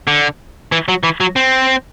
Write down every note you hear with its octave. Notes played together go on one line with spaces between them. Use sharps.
D3
E3
F#3
E3
F#3
C4